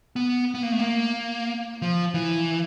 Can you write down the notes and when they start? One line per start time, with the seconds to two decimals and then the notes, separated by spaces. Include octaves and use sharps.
0.16 B3
0.55 B3
0.63 A#3
0.72 A3
0.79 A#3
1.82 F3
2.14 E3